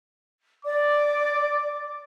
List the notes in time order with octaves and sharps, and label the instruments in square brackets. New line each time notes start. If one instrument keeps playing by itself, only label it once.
[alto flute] D5 [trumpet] D6